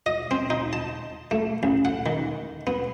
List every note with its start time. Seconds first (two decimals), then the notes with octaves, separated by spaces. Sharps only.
0.06 D#5
0.31 C4
0.50 D#4
0.73 A5
1.31 A3
1.63 A1
1.85 F#5
2.06 D#3
2.67 B3